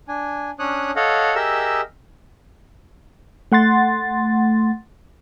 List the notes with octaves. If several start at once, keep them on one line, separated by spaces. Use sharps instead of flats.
D4 G#5
C#4 D4 C#5 D#6 F#6
A4 C#5 D#5 F5 F#5
G4 G#4 A#4 D#5 E5 E6
A3 F#5 C6 A6